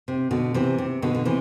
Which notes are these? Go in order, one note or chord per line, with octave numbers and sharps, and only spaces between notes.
C3
B2 D3
C3 E3
C3
B2 D3
D3
C3 E3